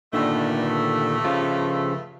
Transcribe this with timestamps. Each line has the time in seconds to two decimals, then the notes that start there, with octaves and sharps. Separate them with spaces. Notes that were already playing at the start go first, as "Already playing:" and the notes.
0.13 G2 A#2 D3 D#3 A3
1.25 C#3 F3 F4